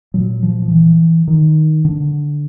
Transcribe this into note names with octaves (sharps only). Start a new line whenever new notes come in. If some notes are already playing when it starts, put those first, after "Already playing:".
A#2 F#3
F3
F3
E3
D#3
D3